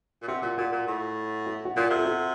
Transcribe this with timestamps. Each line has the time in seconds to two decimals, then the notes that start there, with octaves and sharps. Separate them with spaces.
0.22 A#2
0.28 C3 F#4
0.42 A#2 F4
0.58 A#2 F#4
0.72 A#2
0.87 A2
1.46 F#4
1.65 F#4
1.76 A#2 F4
1.90 C3
1.96 A4
2.05 F#4